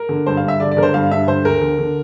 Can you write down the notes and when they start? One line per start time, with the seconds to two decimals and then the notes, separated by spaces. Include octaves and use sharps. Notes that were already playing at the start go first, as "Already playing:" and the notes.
Already playing: A#4
0.09 D3
0.26 G2 C5
0.37 F5
0.44 G2 E5
0.60 D3 D5
0.71 D5
0.77 D3 A#4
0.83 C5
0.94 G2 F5
1.11 G2 E5
1.27 D3 C5
1.45 D2 A#4
1.61 D3
1.79 D3